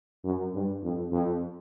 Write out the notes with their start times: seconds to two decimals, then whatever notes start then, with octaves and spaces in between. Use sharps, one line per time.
0.24 F#2
0.54 G2
0.83 F2
1.12 F2